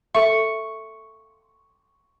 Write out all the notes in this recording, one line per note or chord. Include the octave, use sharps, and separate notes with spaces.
A4 E5 C#6